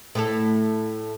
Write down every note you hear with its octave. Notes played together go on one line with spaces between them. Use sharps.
A2 A4